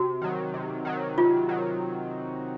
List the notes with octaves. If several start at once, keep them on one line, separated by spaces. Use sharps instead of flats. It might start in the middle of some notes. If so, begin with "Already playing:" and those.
Already playing: C3 F#4
D#3 F#3
C3
D#3 F#3
C3 F4
D#3 F#3